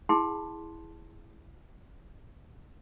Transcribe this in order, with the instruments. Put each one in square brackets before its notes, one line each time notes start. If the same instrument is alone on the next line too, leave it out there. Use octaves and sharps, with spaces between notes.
[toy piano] E4 G#4 F#5 A5 B5 C6